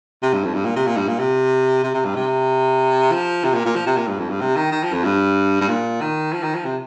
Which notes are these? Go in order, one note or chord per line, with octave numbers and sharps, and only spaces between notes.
C3
G2
F2
G2
A#2
C3
A#2
G2
A#2
C3
C3
C3
G2
C3
F3
C3
A#2
A#2
F3
C3
A#2
G2
F2
G2
C3
D#3
D#3
F3
F2
G2
G2
A#2
D#3
F3
D#3
F3
C3